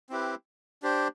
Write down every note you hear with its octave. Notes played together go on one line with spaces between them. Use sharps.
C4 E4 G4 B4
D4 G4 C5